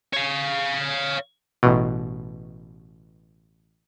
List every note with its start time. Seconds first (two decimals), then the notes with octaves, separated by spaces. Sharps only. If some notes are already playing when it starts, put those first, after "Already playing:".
0.13 C#5 F5
1.63 A1 B2